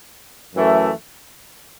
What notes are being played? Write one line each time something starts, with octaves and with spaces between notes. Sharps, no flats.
F#2 E3 A3